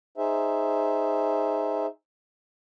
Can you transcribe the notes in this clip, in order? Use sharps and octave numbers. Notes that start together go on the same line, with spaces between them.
D#4 G#4 C5 E5